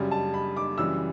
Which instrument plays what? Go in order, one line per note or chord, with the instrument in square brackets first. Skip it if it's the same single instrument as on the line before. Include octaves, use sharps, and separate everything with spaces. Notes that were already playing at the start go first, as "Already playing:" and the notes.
Already playing: [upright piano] F#2 C#3 G3
A5
B5
D6
F#2 C#3 E3 G3 E6